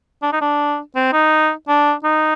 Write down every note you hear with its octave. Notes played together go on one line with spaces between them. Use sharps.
D4
D#4
D4
C4
D#4
D4
D#4